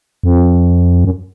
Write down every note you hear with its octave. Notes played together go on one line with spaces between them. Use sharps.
F2
F#2